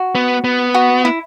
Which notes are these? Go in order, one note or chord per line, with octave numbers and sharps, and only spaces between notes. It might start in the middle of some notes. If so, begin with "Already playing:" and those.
Already playing: F#4
B3
B3
F#4
E4